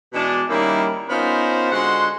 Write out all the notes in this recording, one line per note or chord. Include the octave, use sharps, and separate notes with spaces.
B2 E3 G#3 D4
D#3 G3 A#3 C#4 D#4 E4
B3 C#4 D#4 F4 A#4 C5
D3 G#3 F#4 F#5 C6